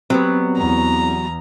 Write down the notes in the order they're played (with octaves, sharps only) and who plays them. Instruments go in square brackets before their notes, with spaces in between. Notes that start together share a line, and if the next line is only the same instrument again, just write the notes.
[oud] F#3 G3 B3 [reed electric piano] C4
[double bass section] E2 [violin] A#5